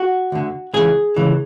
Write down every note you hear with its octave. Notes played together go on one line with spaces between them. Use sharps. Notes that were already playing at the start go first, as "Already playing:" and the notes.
Already playing: F#4
D2 D3
C#2 C#3 E3 G#4
C#2 C#3 E3